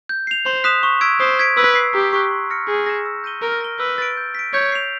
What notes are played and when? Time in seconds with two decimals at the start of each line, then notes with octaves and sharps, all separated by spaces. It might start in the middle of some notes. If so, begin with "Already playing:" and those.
0.09 G6
0.27 C7 F7
0.46 C5 C6
0.64 D#6 F#6 B6 E7
0.83 C#6
1.01 E6 G#6 B6 D7
1.20 C5 D#6
1.39 G#6 B6 D7
1.57 B4 E6
1.75 G#6 C7
1.94 G4 A#5
2.13 C#6 F#6
2.31 C6
2.50 F6 A#6 C#7
2.68 G#4 G6
2.86 A#6 C#7 E7
3.06 E6
3.24 G6 A#6 D#7 G7
3.42 A#4 F6
3.61 A#6 D7 G7
3.79 B4 E6
3.98 A6 D7
4.17 G6
4.35 B6 D7
4.54 C#5 G6
4.72 C7 F7